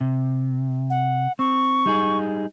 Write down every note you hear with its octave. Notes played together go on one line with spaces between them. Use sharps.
C3
F#5
C4 C#6
G3 D#4 G#4